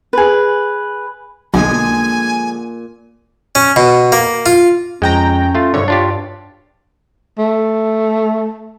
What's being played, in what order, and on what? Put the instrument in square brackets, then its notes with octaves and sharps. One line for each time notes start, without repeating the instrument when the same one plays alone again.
[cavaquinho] G#4 B4
[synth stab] B1 [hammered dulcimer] A#2 [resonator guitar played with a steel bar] D3 F3 G#3 [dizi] G#5
[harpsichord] C#4
B2
A#3
F4
[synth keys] F2 G5 A#5 [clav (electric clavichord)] G#3 [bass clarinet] C#4
[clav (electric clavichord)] A3 F4
[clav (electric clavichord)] C2 D3 [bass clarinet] G2 [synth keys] C#5
[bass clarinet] G2 [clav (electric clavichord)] D4 F4 G4
[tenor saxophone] A3